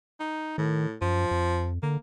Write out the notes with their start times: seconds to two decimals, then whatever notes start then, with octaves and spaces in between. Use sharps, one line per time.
0.20 D#4
0.58 A2 D#3
1.02 F#2 F3
1.31 F2
1.83 D3 A#3